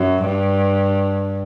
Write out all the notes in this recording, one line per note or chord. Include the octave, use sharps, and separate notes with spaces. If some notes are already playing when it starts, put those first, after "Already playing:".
Already playing: F#2
G2